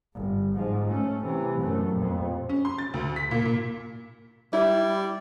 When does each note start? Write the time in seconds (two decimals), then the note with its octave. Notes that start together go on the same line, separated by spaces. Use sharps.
0.15 G1
0.55 G#2 F3
0.87 A3 C#4
1.24 C3 E3
1.60 F#2 A3
1.92 F2 A#2
2.49 C#4
2.65 C6
2.79 A6
2.94 D2
3.16 B6
3.31 A#2
3.45 A#2
4.53 G3 E4